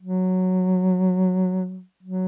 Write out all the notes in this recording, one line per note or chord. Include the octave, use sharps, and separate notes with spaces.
F#3
F#3